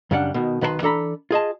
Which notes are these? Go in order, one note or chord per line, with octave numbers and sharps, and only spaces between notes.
F#2 C#3 G3 C#4 D4 F#5
B2 D#3
B1 D#3 B4 C5 A5 C6
E3 D4 A4 A#5 B5
F4 G#4 D#5 A5